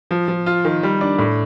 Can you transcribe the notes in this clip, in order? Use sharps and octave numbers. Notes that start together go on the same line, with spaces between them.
F3
F3
F4
D#3
G3
D4
A2